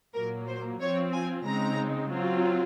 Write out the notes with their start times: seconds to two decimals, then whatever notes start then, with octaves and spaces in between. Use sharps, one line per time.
0.15 A#2 F#3 A#3 A#4
0.48 C5
0.81 F3 C4 F4 C#5
1.14 G#5
1.45 C#3 G#3 C4 D#4 A#5
2.11 F#3 C4 F4